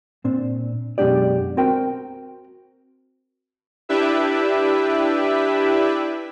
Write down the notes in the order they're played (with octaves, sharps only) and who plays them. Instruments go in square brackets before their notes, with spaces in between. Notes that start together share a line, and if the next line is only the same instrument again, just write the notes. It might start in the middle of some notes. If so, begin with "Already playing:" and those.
[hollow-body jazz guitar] A#2 C4 D4
F#2 B2 G#3 D4 G4 D5
C4 F#4 A#4 G5
[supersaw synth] D4 E4 G4 B4 E5